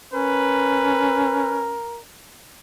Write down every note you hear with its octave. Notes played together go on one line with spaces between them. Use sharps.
C#4 A#4 B4